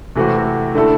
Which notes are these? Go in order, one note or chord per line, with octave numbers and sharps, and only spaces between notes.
C3 E3 A3 C4 F#4
D3 A3 E4 A4